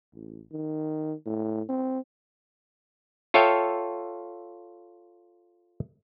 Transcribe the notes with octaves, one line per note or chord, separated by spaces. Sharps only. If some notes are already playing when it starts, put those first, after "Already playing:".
A1
D#3
A2
C4
F4 A4 C#5 E5 F5 G5